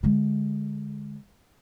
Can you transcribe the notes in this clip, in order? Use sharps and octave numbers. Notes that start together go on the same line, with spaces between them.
D3 G#3